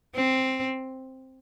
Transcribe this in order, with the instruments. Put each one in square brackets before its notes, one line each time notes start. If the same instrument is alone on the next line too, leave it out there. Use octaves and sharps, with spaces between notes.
[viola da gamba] C4